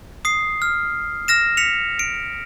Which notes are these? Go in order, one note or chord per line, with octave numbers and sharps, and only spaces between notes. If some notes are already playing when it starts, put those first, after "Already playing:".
D#6 C7
F6
F6 A#6 E7
B6 C#7 F7
D7